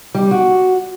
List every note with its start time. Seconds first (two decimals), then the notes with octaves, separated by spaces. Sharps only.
0.14 G3
0.31 F#4